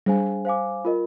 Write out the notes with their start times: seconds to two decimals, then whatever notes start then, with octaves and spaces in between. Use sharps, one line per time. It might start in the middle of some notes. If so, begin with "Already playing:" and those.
0.06 G3 D4 G#4 C5 F5 G#5
0.45 C5 F5 G#5 D6
0.85 F4 A#4 D#5